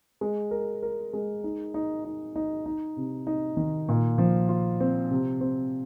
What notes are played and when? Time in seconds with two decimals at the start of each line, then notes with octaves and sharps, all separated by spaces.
0.21 G#3
0.51 A#4
0.83 A#4
1.13 G#3
1.44 D#4
1.74 D#4
2.05 D#4
2.36 D#4
2.66 D#4
2.97 C3
3.27 D#4
3.57 D#3
3.89 A#2
4.18 F3
4.49 F4
4.80 C4
5.11 C3
5.41 C4